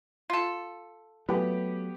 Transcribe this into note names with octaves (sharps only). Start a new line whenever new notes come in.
F4 A4
F#3 A3 B3 G4